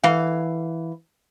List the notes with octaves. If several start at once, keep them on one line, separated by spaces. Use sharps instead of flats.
E3 F5